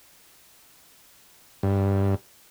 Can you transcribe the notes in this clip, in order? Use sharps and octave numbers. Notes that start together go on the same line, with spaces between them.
G2